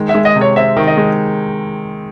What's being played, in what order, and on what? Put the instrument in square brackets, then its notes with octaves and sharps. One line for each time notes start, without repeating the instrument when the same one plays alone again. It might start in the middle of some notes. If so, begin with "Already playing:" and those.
Already playing: [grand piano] D#3 G#3
[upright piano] E5
[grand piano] G#3
[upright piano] D#5
[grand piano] C3
[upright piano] C#5
[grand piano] C4 [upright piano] E5
[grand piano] D#3
[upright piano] D#5
[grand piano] G#3